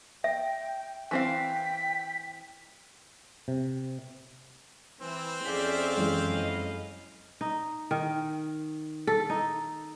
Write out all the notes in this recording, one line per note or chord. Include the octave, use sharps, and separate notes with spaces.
E5 G5
E3 C4 F5 G5 B6
C3
E3 C4 E6
F2 C#4 G#4 D5 E5 F5 G6 B6
F#2 E3 G#3
F#3 E4 D#5
D#4
D#3
A4
D#4